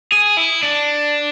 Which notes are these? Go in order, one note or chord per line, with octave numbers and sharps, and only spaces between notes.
G#4
E4
D4